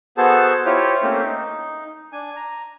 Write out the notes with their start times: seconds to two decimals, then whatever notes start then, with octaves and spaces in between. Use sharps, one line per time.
0.17 B3 F#4 G#4 A4 C5 A5
0.66 E4 F4 G4 C5 C#5
1.02 A3 A#3 C4 C#4 C5
1.25 D#4
2.13 D4 G#5
2.36 A#5